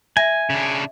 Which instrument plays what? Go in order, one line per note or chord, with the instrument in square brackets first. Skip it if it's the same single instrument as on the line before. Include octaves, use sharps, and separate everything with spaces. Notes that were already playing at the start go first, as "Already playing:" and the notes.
[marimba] E5 A#6 [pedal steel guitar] G#5
[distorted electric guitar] C#3 D4